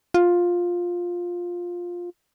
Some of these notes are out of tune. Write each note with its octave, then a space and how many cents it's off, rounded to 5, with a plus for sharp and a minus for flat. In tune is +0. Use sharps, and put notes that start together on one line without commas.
F4 +10